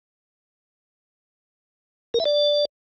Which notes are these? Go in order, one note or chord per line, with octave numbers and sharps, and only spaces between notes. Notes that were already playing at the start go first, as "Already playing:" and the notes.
A#4
E5
D5